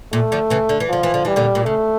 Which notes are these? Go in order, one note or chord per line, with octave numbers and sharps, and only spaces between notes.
A#2 A3
D3 F3
C#3 E3
D3
E3
D3 F3
E3
D3
E3 G3
A#2 D3
A#2
C#3 A3